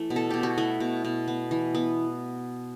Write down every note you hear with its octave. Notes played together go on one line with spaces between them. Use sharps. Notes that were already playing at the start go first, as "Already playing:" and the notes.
Already playing: E3 A3
B2
A4
B2 G4
F#4
A3 E4
B2
B2
B3
E3
B3